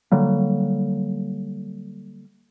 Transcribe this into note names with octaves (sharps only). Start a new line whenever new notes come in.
D3 F#3 G3 A#3